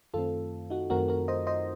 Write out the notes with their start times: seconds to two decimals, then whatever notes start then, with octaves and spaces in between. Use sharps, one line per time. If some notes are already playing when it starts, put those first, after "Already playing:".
0.14 F#2 D#3 A3 C4 F4 A4
0.70 D#4 F#4
0.90 F#2 D#3 A3 C4 F#4 A#4
1.08 F#4 A#4
1.28 C5 D#5
1.47 C5 D#5